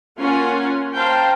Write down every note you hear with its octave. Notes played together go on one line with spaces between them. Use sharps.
A#3 C#4 F4 A#4 F#5 G#5
C5 F5 G5 A5 A#5